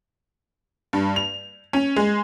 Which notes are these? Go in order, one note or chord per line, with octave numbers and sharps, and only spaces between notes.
G2
F7
C#4
G#3